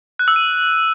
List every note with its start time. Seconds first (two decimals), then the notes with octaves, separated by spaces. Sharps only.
0.19 F#6
0.28 E6
0.36 D#7